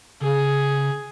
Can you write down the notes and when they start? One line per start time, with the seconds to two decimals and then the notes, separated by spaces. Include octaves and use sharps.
0.21 C#3 G#4